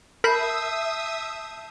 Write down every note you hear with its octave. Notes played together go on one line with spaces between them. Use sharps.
A#4 E5 A5 B5 D#6 E6 G6 C7